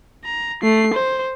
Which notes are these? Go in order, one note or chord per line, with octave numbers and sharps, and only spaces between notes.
A#5
A3 C7
C5